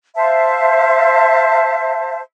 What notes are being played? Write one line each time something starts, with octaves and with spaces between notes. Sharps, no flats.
C5 E5 F5 A5